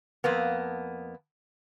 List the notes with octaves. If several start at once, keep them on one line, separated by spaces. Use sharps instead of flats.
F2 A#3 B3